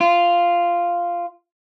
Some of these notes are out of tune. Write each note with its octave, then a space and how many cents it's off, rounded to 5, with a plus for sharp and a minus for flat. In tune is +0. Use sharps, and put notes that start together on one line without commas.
F4 -5